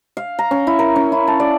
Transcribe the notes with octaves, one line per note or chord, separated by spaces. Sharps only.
F5
A#5
C#4
E4
A#4
C#4
E4
A5
D5